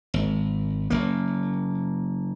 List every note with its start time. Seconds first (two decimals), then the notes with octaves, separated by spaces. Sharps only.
0.14 G#1
0.90 F#1 A#3